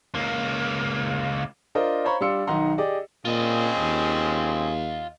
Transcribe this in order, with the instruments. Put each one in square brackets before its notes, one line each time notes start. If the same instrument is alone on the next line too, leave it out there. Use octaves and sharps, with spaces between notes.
[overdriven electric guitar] C#2 A#3
[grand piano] D4 F4 A#4 C5 D#5
C5 C#5 F5 A#5 B5 C#6
G3 D4 F5 C6 E6 C#7
B1 D#3 D#4 F#5 A#5 C6
G4 G#4 D5 D#5
[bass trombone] A#2 [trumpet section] C4 C#4 G#4 [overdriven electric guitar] F4 D#5
[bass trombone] D#2